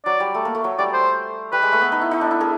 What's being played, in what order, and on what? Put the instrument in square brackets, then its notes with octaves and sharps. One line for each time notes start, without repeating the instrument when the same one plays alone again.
[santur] F#3 [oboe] D5
[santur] G3
A3
A#3
A3
F#3
[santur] G3 [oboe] D5
[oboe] C5
[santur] G3 [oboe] B4
[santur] G#3
A3
B3
D#4
E4
D#4
D4
E4
G#4 A#4